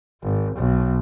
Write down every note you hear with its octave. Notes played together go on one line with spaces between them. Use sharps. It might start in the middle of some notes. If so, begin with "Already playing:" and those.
G#1
B1